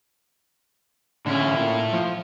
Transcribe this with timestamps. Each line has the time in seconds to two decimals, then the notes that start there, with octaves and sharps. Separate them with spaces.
1.26 A2 D3 C#4 E4
1.56 A#2
1.93 F3 F4